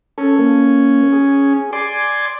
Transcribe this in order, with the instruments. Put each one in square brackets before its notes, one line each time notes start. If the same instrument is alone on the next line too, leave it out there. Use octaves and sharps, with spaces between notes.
[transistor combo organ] C#4 [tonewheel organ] A4
[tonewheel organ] A#3
G#4
[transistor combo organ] D5 [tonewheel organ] G#5 C6 D6